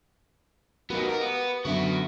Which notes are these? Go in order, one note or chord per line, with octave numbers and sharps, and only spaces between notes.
A#3 B3 D#4 F#4 G4
A#4
B3
F#2 D3 B3 F#4 E5